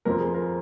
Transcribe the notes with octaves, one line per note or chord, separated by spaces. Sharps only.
F2 F3 C4 A#4
G#4
A#4